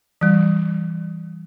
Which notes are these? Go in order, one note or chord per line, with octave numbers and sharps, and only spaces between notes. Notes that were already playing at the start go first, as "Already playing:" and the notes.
E3 G3